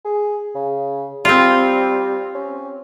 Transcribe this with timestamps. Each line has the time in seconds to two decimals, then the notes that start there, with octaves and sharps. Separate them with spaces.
0.05 G#4
0.55 C#3
1.25 G3 C4 F4
2.34 C#4